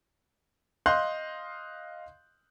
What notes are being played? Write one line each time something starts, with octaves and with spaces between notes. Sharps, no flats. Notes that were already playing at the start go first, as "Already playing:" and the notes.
D#5 F5 C6 F#6 G6